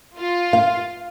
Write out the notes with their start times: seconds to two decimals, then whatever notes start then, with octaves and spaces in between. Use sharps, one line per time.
0.15 F4
0.53 F5